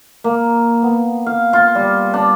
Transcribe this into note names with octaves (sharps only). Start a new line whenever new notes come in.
A#3
B3
F5
F4
G3
D4